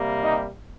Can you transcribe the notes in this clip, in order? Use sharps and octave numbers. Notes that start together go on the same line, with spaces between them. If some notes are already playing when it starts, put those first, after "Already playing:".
Already playing: C3 G3 A#3
D#4